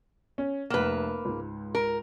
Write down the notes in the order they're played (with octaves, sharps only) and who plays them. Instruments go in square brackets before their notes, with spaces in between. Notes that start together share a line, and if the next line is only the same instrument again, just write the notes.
[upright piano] C#4
[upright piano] F1 F#5 E7 [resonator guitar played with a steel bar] A#3 B4
[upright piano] C#2 G#2
[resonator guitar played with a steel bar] A#4